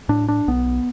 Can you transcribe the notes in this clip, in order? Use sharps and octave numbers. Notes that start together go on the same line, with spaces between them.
A2 D4
D4
B1 B3